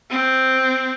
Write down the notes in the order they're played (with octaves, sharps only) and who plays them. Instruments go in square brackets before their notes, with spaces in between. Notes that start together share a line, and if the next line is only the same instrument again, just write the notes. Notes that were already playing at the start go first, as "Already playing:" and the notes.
[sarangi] C4